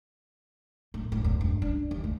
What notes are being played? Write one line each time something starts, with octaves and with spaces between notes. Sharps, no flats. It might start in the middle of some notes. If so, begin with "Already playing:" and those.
A2
A2
E2
G2
D4
D#2
A3